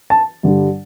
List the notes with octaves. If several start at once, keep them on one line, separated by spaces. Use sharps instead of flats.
A5
G2 D3 G3